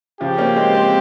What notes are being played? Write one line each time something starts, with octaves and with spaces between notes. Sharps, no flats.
C#3 F3 G4
A#3 C#4
G#3 C4
G#3 C4